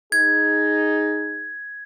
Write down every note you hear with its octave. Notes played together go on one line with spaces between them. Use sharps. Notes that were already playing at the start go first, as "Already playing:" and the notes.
D#4 G#4 G#6